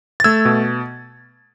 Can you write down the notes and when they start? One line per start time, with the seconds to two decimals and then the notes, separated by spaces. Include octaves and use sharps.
0.20 A6
0.24 A3 E6 G#6
0.45 B2